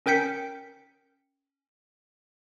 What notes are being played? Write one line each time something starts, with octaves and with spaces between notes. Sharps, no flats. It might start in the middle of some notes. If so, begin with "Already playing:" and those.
C#4 A#4 G5 G6 B6 C#7